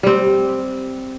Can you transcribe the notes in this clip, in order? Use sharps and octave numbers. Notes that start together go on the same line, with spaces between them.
G3 C4